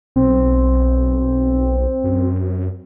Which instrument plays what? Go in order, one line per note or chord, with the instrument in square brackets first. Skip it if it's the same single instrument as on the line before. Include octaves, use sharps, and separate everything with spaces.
[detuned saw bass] B1 [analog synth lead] C4
[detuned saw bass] F#2